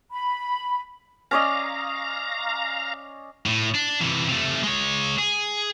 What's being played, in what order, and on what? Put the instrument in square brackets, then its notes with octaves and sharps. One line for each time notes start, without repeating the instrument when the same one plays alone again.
[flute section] B5
[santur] C#4 D5 D#5 [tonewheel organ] F5 A#5
[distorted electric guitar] A2
D4
C3 E3
C3 A3
G#3 C#5
G#4